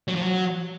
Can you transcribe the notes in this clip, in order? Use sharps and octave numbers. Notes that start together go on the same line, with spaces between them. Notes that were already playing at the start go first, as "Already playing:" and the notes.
F#3
F3
F#3